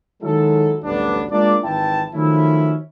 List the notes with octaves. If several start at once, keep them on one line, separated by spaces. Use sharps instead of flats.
D#3 F#3 G#3 E4 A4
A1 D2 G2 F#3 B3 D4
G#3 A#3 D4 F4 D5
G#1 E3 E4 G5 A5
D#3 F3 F#3 A3 C#4 E4